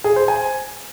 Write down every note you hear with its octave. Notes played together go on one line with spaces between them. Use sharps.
G#4
C5
G#5